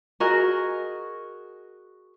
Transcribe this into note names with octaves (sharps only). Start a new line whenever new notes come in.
F#4 G#4 A#4 D#5